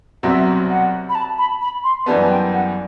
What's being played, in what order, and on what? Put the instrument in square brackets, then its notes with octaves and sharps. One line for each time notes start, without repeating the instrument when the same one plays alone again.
[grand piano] C2 B2 F#3 C4 [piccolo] E5
[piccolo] F#5
B5
A5
B5
B5
C6
[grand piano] F#2 E3 G3 B3 [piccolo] A5
[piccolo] G5
F#5